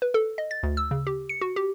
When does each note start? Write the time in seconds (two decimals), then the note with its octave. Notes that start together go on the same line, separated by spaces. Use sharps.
0.02 B4
0.14 A4
0.38 D#5
0.51 A6
0.63 D2
0.77 E6
0.91 C#3
1.07 G4
1.29 C#7
1.41 F#4
1.56 G4